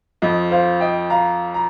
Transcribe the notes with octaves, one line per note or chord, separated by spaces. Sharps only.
F2 F3 D#5
C5 F5
D#5 G5
F5 A#5
A#5